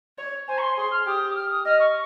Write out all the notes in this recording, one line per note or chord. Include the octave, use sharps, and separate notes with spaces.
C#5
C5 G#5
C#6
C6
G#4 C6
F6
G4 D#6
D#6
F6
D#6
D#5 F6
C#6